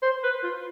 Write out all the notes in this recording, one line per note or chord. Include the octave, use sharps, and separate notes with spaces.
C5
B4
F4